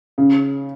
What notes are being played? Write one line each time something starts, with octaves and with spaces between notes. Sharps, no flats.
C#3